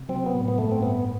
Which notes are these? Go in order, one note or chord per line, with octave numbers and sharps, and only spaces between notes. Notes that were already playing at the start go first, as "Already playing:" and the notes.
Already playing: C3
F#3 C4
B3
A2
B3
G2 A3
C4
G2 B3